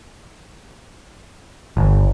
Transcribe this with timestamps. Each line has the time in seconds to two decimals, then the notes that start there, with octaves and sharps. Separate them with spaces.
1.77 G1